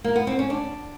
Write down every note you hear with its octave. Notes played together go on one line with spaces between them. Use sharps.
A#3
B3
C4
C#4
D4